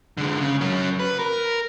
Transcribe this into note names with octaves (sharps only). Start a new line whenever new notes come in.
D3 G#3
C#3
F#3 C#4
B4
A#4